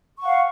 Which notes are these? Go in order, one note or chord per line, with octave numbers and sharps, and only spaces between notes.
F5 F#5 C#6